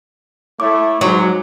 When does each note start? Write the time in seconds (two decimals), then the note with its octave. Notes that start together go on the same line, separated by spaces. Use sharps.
0.60 A3 E4 C#5 D6
1.01 G#2 F#3